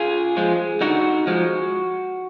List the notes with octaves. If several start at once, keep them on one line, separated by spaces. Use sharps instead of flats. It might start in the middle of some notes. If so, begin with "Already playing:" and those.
Already playing: F4 G#4
F3 G#3
D3 D#4 F#4
F3 G#3